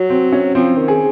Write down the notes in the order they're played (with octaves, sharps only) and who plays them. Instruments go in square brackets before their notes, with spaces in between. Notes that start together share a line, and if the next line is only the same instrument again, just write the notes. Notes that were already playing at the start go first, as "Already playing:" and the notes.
Already playing: [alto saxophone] F#3
[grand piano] C4
C#4
[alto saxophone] F3 [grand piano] C4
[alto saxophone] D#3
[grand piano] G#4